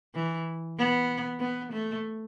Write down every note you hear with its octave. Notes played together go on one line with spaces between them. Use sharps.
E3
B3
B3
A3